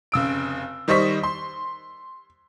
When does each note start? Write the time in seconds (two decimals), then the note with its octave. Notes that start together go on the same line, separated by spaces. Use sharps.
0.12 F1 C#3 E6 D7
0.88 D#3 G3 C5 D#5 C#6 B6
1.24 C6